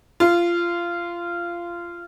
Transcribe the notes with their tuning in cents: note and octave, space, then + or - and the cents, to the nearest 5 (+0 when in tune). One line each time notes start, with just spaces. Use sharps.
F4 -20